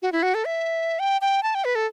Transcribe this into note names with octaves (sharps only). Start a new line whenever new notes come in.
F#4
E4
F#4
A4
E5
G5
G5
A5
G5
B4
A4